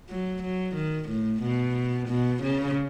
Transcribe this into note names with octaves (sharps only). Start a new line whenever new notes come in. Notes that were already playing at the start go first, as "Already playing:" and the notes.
F#3
F#3
D#3
A2
B2
B2
C#3